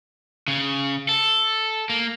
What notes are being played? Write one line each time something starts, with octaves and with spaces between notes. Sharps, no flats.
C#3
A4
A#3